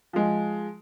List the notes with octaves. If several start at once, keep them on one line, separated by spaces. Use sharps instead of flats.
F3 G#3